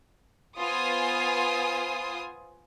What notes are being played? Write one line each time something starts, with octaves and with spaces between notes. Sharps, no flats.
B3 F4 C5 G#5 D#6